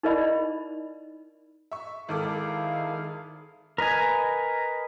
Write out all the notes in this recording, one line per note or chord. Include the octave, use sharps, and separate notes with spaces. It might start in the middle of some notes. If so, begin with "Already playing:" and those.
D#4 E4 A#4 D5 D#5 B5
E5 C#6
G#1 D#3 E4 G#4 A4 F5 D6
A#4 B4 D#5 G#5